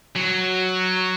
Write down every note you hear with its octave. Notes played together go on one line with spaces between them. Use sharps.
F#3